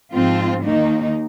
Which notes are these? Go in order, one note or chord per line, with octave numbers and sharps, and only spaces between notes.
G#2 F3 C4 F4
D#2 D#3 A#3 D#4